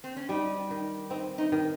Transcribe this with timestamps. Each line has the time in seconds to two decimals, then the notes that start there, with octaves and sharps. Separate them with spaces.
0.04 C4
0.16 C#4
0.29 G3 D#4
0.70 D#3
1.10 C4 D#4
1.38 D#4
1.52 D#3